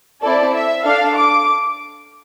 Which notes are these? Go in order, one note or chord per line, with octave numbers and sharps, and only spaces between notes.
C4 E4 A4 D5
E5
D4 A4 F5
D6